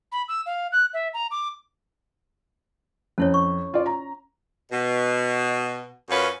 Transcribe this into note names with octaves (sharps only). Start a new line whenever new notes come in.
B5
E6
F5
F#6
E5
A#5
D6
F2 C#4 E4 C#5
C#6
F4 D5
A#5
B2
F#2 C#4 F4 B4